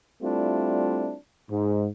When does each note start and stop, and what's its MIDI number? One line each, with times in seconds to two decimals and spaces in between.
0.22 1.15 55
0.22 1.15 57
0.22 1.15 60
0.22 1.15 62
0.22 1.15 64
0.22 1.15 65
1.50 1.87 44